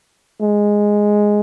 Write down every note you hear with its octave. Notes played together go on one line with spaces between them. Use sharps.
G#3